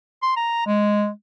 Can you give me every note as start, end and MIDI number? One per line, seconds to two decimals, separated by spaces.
0.22 0.33 84
0.36 0.63 82
0.67 1.09 56